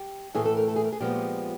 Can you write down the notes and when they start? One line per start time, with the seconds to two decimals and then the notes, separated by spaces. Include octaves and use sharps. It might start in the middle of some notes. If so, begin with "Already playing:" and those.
Already playing: G4
0.35 A2 E3 A3 G#4
0.45 A4
0.57 A#4
0.68 A4
0.76 G#4
0.85 A#4
0.92 G#4
1.00 A#2 F3 G#3 B3 G4